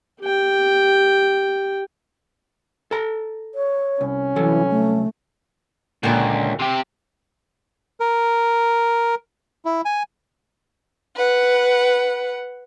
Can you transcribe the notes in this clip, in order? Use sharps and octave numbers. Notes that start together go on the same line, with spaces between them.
G4 G5
A4 A#5
C#5
C2 C#4
C2 E3 F#3 A4
A3
C#2 A#2 D3
C3 G4
A#4
E4
G#5
B4 F#5